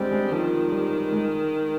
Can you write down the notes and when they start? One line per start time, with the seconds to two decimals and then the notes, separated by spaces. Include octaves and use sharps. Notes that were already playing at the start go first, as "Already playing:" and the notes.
Already playing: G3 G#3 C4 D4
0.11 G#3
0.31 D#3 F3
0.72 G3
1.12 G#3